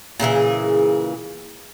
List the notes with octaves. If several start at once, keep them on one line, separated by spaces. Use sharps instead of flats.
A#2 C#3 E3 G#4